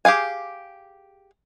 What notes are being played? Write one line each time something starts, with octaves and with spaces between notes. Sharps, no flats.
G4 G#4 F5 G#5